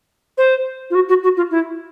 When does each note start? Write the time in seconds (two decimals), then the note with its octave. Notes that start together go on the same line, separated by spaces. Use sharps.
0.37 C5
0.90 F4
0.95 F#4
1.08 F#4
1.23 F#4
1.37 F4
1.51 E4